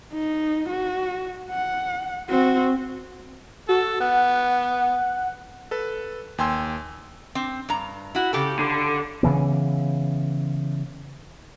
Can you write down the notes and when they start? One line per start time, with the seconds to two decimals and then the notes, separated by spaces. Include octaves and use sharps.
0.14 D#4
0.69 F#4
1.50 F#5
2.29 C4 F#4
3.69 F#4 A4
4.00 B3 F#5
5.71 A4 B4
6.38 D#2 G5 G#5 C6 E6
7.35 C4
7.69 G2 A#5
8.15 E4 F#4
8.33 C#3 G4 A4
8.59 D3
9.23 C#3 E3 B3